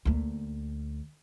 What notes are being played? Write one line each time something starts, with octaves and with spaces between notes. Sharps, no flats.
D2 A#3